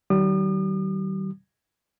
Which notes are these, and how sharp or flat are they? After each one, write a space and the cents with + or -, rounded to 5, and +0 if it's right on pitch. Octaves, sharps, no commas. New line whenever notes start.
D#3 +0 G3 -40 D#6 -45